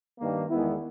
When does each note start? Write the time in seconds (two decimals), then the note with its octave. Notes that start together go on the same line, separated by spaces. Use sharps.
0.19 G2 D#3 A#3
0.49 E2 D#3 G#3 B3 E4